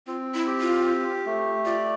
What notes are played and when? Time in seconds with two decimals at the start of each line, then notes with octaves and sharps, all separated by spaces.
0.07 C4 F4
0.34 E4
0.47 G4
0.60 F4
0.86 G4
1.26 A3
1.65 F4 D5